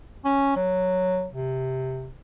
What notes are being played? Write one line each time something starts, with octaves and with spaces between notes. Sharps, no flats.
C#4
F#3
C3